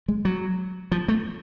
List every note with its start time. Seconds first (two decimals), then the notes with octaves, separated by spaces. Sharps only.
0.08 G#3
0.25 F#3
0.92 F3
1.08 A3